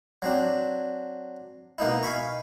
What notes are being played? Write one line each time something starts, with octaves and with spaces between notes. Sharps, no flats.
F#3 C4 D4
B2 A#3 D#4 E4
F5 G#5 B5 C#6